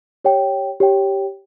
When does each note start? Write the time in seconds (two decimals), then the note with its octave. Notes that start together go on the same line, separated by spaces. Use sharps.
0.25 G4 C#5 G5
0.80 G4 C#5 G5